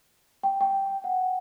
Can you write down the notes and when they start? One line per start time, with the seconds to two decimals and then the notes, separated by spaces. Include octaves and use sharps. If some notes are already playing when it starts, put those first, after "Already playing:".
0.43 G5
0.61 G5
1.04 F#5